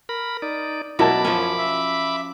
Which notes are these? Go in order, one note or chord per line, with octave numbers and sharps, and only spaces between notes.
A#4 B5
D#4 D5
B2 F#3 E4 A#4 A5 B5 D6
F#2 F3 C#4
E5